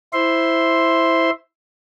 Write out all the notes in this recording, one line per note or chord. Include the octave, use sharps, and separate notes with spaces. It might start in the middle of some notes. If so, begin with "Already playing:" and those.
E4 C5 E5 C6